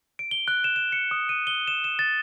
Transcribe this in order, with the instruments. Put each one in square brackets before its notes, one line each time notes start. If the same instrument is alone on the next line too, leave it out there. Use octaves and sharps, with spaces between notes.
[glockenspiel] D7
G7
F#6
E7
E7
C#7
D#6
D#7
G7
E7
E7
A6